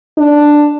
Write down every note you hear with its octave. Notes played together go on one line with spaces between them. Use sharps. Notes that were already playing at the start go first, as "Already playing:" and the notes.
D4